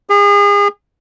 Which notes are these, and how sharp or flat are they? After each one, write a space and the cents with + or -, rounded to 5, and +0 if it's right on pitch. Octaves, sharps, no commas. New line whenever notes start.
G#4 -35